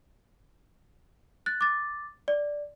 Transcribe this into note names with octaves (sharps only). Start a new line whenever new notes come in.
F#6 A6
D6 A6
D5